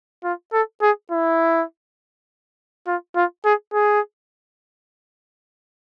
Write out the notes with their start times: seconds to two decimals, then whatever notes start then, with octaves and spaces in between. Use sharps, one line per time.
0.24 F4
0.53 A4
0.82 G#4
1.11 E4
2.87 F4
3.16 F4
3.45 G#4
3.74 G#4